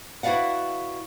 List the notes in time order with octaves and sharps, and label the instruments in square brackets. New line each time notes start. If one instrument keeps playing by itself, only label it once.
[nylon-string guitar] E4 F#4 B4 D5 F5 F#5